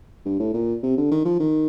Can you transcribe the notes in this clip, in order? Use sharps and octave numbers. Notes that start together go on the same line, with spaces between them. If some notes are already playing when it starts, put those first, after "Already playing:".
G2
A2
A#2
C3
D3
D#3
F3
D#3